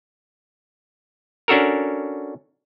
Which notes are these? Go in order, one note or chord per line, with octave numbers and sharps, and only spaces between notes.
C#4 D4 F#4 A4 A#4